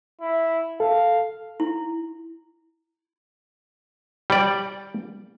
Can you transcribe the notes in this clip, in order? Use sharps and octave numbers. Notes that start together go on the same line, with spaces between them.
E4
A4 F5
E4
G3 D5